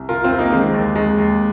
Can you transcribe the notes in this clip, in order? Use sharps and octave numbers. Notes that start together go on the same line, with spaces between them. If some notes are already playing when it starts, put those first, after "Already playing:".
Already playing: C2
C3 F4 A#4
C4 F4
C2
A#3 D#4
D#3 G#3 C4
D#2
D#2 G#3
D#2